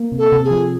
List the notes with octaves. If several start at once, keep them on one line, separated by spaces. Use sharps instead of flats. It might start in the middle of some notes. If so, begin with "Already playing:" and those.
Already playing: A#3
C3
A4
C3
G#4
F3